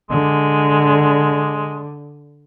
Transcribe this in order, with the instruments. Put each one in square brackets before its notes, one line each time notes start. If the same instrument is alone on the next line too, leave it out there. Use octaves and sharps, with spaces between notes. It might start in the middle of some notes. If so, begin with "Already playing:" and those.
[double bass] D3 [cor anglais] G#3